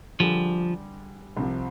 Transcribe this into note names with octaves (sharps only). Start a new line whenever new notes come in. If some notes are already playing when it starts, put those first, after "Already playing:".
D3 F3 G3 D4 G#4
C2 C3 F3